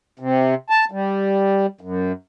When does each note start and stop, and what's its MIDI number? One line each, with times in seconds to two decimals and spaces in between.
0.19 0.55 48
0.70 0.85 81
0.91 1.66 55
1.81 2.12 42